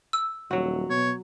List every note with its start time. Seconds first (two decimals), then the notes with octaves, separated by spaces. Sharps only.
0.13 E6
0.51 D#1 F#3 F#4
0.90 B2 C#5